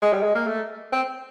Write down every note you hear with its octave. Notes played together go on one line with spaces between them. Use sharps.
G#3
G3
G#3
A#3
A3
C4